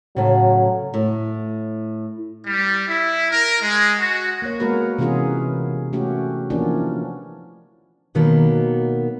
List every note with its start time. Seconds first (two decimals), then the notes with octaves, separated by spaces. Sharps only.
0.16 A2 C#3 F#3
0.94 A2
2.46 G3
2.88 E4
3.31 A#4
3.61 G#3
3.99 F#4
4.42 A#3 C#5
4.60 G#3 A#3 B3 F#4 A#4 B4
4.98 C3 E3 B3 C#4 F4 G#4
5.93 A3 C#4 F#4 G4
6.50 E3 F3 A#3 B3 C#4 D4
8.15 B2 D#3 F#3 A#3 B3